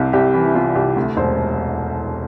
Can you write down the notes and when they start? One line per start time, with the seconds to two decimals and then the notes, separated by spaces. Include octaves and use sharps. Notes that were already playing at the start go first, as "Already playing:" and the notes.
Already playing: C2 C3
0.13 C2 G4
0.34 E3
0.47 E4
0.55 C3 F4
0.75 C2 G4
0.96 D2
1.17 E1 C5